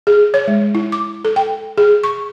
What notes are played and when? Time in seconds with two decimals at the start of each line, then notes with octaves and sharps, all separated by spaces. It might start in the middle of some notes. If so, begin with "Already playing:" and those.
0.07 G#4
0.34 C#5
0.48 G#3
0.75 E4
0.92 D6
1.25 A4
1.36 G5
1.78 G#4
2.04 C#6